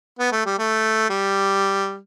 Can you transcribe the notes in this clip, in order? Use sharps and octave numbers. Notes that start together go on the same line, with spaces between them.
B3
A3
G3
A3
G3